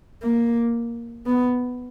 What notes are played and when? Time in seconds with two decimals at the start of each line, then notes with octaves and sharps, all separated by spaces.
0.23 A#3
1.26 B3